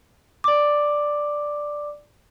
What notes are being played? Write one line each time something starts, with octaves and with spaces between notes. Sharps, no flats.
D5 D6